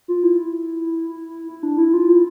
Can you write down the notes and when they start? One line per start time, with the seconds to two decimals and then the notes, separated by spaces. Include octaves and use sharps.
0.08 F4
0.23 E4
1.48 E4
1.63 D4
1.78 E4
1.93 F4
2.09 E4